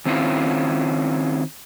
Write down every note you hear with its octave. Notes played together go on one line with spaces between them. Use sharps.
D#3 C4 C#4 E4 F4